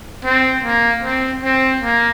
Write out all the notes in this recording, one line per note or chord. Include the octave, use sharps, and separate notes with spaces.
C4
A#3
C4
C4
A#3